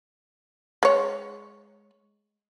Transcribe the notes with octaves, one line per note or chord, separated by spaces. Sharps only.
G#3 C#5